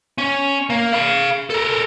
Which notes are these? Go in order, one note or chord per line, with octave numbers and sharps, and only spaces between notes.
C#4
A#3
F5 B5
A4 A#4